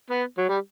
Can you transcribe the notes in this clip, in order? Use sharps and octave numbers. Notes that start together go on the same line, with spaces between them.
B3
F#3
G3